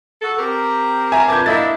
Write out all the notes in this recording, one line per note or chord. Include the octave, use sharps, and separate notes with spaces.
F#4 A4
C4 G4 A#4
E5 G#5 A#5
F2 D3 B4 A5 D6 G6 G#6
A#3 D4 E4 D#5 E5 A6